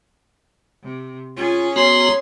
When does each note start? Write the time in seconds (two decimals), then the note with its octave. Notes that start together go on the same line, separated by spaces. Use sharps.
0.83 C3
1.37 C#4 F4 G#4
1.76 B3 F#4 C#5 A#5 C6